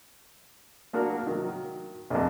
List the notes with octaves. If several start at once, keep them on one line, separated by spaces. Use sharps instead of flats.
A#3 D4 F#4 A#4
D#3 F#3
A#1 F2